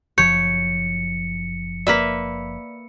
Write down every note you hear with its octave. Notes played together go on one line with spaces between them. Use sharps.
F#1 F3 C#5 G6 C#7
A#3 B4 D5 E5 B6